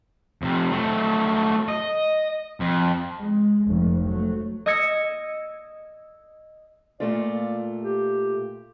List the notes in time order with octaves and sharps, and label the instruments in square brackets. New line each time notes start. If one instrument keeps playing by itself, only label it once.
[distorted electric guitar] F2 C3
F#3 A3
D#5
F2
[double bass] G#3
F1 F2
F#3 A3
[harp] D#5 D#6 E6 G#6 A#6 C#7
[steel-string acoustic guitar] A#2 A3 F4 [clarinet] D5
[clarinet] G4